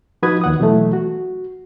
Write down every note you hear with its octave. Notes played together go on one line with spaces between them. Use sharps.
F3 D#4 F#4 B4 D#6 G#6
D#2 F#5 D#6
B2 E3 F#3 A3
F#4